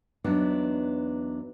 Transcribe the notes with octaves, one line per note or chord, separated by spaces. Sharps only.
E2 F#3 B3 D4 D#4